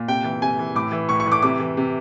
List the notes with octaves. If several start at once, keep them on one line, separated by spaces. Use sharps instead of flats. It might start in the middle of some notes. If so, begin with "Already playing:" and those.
Already playing: A#2
C3 G5
E3
C3 G#5
E3
A2 D6
E3
A2 C#6
C#6
E3
D6
C3 D6
E3
C3